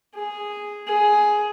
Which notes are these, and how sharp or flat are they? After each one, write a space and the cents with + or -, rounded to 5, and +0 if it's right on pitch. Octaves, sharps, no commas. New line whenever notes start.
G#4 -5
G#4 +10